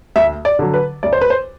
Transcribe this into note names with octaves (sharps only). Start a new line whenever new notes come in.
D2 E5
D5
D3 F#3
B4
D2 D5
C5
B4
C5